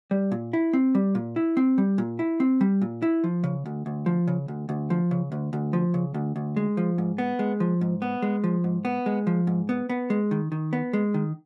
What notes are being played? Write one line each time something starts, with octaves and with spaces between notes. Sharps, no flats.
G3
A#2
E4
C4
G3
A#2
E4
C4
G3
A#2
E4
C4
G3
A#2
E4
F3
C#3
D2
D2
F3
C#3
D2
D2
F3
C#3
D2
D2
F3
C#3
D2
D2
G#3
F3
G#2
B3
G#3
F3
G#2
B3
G#3
F3
G#2
B3
G#3
F3
G#2
B3
B3
G#3
D#3
D#3
B3
G#3
D#3